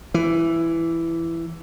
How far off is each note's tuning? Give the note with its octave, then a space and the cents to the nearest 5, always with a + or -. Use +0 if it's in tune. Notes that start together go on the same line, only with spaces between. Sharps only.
E3 +10